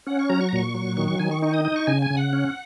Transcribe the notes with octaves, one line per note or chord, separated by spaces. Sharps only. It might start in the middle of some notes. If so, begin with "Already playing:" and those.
C#4 F#5
C#6
F#3 A#5
C#6
A#5
A#2 C#6
F#3
D#3 C#6
C#6
D#3 G#5
C#6
D#4 C#6
D#6
D#4 D#6
C#6
C#3 G#5
G#5
C#3
F#5
C#4